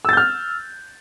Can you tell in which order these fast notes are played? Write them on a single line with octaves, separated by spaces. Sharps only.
E6 A6 G6 F6